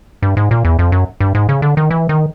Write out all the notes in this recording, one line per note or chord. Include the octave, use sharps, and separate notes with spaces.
G2
G#2
A#2
E2
F2
F#2
G2
G#2
C#3
D3
D#3
E3
D#3